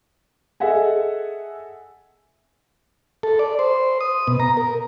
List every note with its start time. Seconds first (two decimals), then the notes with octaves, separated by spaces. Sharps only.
0.60 G#4 A4 D#5 E5 F#5 G#5
3.23 A4
3.39 D5
3.59 C5
4.01 D#6
4.27 B2
4.40 A#5
4.57 A#4